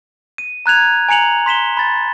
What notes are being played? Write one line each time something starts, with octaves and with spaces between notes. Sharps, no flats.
D#7
A#5 F#6 G#6 F7
G#5 A#5 C#7 F7 F#7
C6 B6 E7 G7
B5 A6